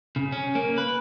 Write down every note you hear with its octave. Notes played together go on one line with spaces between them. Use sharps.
C#3
C#4
A#3
B4